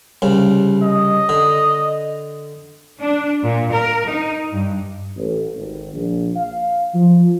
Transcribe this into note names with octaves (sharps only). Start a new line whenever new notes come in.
C2 C#3
D#5
D3
D4
A#2
A#4
D#4
G2
A1
G#1
A#1
F5
F3